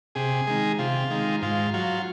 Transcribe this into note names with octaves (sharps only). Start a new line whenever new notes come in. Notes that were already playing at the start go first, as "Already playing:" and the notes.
C3 G#4
D#3 G#3
C3 F4
D#3 G#3
G#2 F4
F#3 F4